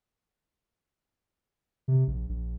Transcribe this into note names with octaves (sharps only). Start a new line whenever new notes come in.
C3
A#1
A#1